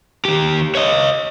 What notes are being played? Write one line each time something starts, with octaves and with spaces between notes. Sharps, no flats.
D#3 G4
C#5 D#5